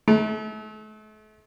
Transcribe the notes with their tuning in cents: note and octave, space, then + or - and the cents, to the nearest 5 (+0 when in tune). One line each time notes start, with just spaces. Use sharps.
A3 -40